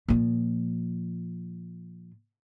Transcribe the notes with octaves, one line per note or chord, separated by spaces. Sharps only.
A#2 F3